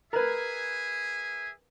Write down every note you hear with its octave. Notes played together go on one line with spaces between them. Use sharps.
G#4 A#4 B4 E5 G#5